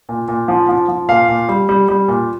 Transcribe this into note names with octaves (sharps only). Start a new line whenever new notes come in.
A#2
A#2
F3
F3
F3
A#2 F5
A#2
G3
G3
G3
A#2